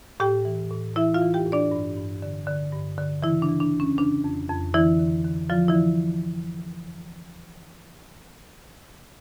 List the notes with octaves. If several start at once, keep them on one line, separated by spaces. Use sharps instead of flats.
A2 G4 G5
E3
A2
E3 E4 E5
F4 F5
E3
G4 G5
A2
D4 D5
G2
G2
D3
D3
G2
D3
C#3 E3 E4
D4
E3
D4
F2
C#4
C#3 D4
F2
F2
D3 E3 E4
D3
D3
D3 F3 F4
E3 E4
D3